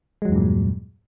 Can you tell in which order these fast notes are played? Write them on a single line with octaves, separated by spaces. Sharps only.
G#3 F#3 E2 G2 A#2